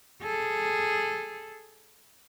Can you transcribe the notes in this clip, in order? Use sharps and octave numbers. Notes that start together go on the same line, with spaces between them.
G#4 A4